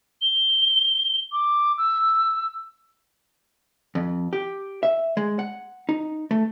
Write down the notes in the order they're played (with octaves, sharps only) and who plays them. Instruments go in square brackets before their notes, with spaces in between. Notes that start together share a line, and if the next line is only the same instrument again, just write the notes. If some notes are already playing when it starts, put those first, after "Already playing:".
[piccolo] G7
D6
E6
[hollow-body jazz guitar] F2
G4
E5
G#3
F#5
D#4
A3